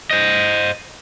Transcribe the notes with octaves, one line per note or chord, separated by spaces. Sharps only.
C5 D#5